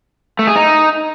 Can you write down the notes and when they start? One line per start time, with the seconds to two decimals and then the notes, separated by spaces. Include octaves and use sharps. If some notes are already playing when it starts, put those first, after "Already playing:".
0.39 A3
0.47 G#4
0.56 D#4